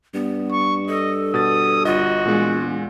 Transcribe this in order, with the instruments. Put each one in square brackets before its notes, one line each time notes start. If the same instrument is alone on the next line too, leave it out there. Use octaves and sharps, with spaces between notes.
[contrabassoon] G2 [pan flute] B3
[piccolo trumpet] C#6
[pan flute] A4 [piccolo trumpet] D#5
[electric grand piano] B2 A6 [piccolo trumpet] D#6
[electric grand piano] G1 D#5 [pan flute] F4 [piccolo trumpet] F#4
[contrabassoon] E1 [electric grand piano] A#2 G#3